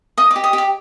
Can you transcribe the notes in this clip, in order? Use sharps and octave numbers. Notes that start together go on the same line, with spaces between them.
D#5 D#6
D6
G4
D#6
G4
D6